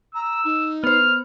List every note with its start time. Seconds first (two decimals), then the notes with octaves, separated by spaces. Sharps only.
0.15 A#5 E6
0.45 D#4
0.84 B3 C5 F6